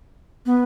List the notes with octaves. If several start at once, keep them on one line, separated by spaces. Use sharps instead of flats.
B3